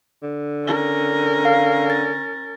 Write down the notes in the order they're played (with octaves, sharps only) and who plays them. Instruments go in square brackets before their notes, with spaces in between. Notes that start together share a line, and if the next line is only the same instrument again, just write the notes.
[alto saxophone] D3
[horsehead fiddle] C#4 A#4
[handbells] F5
A6